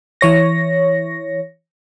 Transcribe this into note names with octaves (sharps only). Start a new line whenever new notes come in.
E3 C#5 A#6